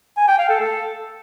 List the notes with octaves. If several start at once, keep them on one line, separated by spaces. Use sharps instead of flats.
G#5
G5
F5
A4
A4